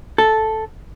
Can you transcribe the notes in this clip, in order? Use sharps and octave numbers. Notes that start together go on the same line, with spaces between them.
A4